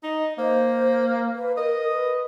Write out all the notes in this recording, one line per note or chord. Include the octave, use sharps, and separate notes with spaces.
D#4 D#5
A#3 C5
B4
A#4 D#5
B4